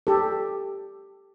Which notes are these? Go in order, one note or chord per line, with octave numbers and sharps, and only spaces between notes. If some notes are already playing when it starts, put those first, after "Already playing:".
G4 A4